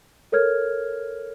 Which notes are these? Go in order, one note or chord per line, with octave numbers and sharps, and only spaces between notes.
A4 A#4 C#5 F6 G#6